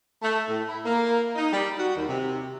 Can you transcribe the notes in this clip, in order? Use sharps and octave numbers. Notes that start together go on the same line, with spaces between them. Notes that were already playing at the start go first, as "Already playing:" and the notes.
A3
A2
E4
A#3
D#4
G3
F#4
D#2
C3